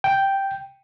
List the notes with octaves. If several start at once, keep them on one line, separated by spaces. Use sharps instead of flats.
G5